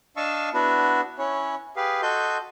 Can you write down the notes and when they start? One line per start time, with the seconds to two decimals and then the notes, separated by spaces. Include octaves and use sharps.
0.17 D4 D#5 F5 A5 C#6 E6
0.54 B3 D4 E4 F#4
1.18 C#4 E4 C#5
1.76 G4 G#4 B4 F5
2.02 F#4 A4 D#5 C6 G6